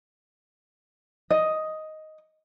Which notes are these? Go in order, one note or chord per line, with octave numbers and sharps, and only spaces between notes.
D#5